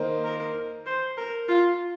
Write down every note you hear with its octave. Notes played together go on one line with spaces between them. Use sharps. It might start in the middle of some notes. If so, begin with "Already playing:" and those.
Already playing: D#3 A#3 D#4 C5
A#4
C5
A#4
F4